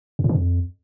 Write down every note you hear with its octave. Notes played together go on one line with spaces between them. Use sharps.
F2
A2
E3
F2